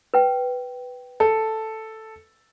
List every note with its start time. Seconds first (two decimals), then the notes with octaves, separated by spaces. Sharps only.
0.14 B4 G5
1.20 A4